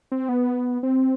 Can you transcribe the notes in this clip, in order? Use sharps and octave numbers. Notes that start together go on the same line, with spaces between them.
C4
B3
C4